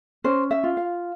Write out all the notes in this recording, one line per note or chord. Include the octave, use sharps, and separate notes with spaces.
C#4 C5
E5
F4
F5